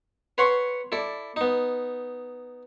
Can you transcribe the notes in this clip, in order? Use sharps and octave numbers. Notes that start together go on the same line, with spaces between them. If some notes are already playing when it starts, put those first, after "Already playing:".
B4 C#5 F#5 C6 C#6
E4 A4 D5
B3 D#4